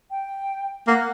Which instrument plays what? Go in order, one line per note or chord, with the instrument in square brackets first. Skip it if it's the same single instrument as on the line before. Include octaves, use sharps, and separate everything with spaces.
[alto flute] G5
[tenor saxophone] A#3 [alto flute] F#5